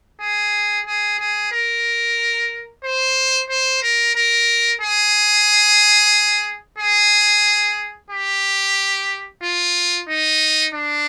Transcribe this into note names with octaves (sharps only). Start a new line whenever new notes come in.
G#4
G#4
G#4
A#4
C5
C5
A#4
A#4
G#4
G#4
G4
F4
D#4
D4